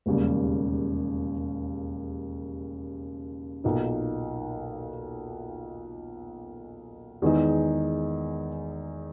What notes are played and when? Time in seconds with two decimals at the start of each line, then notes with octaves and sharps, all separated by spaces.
0.06 E1 D#2 C#3 G3
3.64 B1 A#2 A#3 D#4
7.22 E2 D#3 G#3 D#4